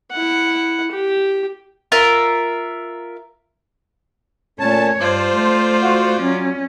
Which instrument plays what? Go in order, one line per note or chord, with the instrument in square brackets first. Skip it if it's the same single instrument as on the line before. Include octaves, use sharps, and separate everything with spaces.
[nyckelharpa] E4 F#5
G4
[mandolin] F4 A#4 E5
[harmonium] A#2 C#4 [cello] A3 C#5 [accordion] A5
[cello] G2 [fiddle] F4 D5 [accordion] C5 [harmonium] A5
[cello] A3
[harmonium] F#4 F5 F#5
[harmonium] F#3 [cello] C#4